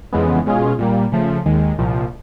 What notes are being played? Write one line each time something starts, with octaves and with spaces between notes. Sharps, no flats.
F2 C#3 E3 G#3 B3
B2 G#3 C#4 F4 G#4
A#2 G3 A#3
C#3 F3 A3
D#2 D#3 G#3
C2 A#2 F3